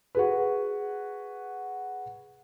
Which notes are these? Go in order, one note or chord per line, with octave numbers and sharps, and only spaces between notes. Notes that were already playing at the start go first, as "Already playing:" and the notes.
F#4 G#4 B4